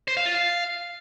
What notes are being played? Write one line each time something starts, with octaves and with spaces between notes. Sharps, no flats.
C5
F5
F4
F5